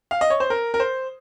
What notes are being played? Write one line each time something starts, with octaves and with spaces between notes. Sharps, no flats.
F5
D#5
C#5
C5
A#4
A#4
C5